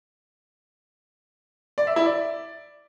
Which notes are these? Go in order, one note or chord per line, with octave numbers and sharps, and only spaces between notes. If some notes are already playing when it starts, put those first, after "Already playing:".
D5
E5
E4
D5